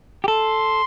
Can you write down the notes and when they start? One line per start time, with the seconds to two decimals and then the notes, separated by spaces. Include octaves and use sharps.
0.24 G4
0.28 A4 C6